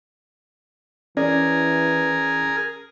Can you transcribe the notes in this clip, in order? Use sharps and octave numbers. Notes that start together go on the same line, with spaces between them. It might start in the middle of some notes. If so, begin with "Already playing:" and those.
E3 C#4 G#4 A#4 D5